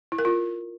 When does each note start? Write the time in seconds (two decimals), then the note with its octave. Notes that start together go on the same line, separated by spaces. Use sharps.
0.12 E4
0.18 A#4
0.25 F4